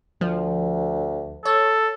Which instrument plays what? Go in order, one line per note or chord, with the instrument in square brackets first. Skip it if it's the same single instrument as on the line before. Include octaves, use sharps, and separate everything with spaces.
[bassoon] D2 [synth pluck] F3
[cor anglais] A4 [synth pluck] C#5